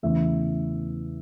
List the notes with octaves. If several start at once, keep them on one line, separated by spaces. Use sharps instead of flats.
E2 C#3 E3 A3 E5